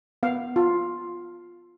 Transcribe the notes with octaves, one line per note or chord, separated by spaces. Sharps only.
B3 F5
F4